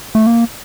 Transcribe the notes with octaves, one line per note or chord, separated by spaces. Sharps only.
A3
A#3